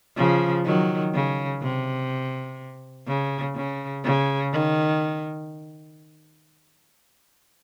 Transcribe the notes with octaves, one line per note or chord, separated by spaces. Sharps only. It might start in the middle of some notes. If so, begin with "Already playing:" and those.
C#3 F3
D#3 F#3
C#3
C3
C#3
C#3
C#3
D#3